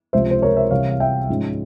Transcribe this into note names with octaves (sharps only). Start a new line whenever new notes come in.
C#2 C3 F3 G#3 C5 E5
C5
A#4 C#5
C5 E5
C2 C3 E3 C#5 F5
F5
E5 G5
G#2 F3 G#3 C#4